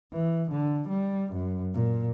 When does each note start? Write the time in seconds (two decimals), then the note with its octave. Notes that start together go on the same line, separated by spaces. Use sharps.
0.13 E3
0.52 D3
0.89 G3
1.33 F#2
1.74 A#2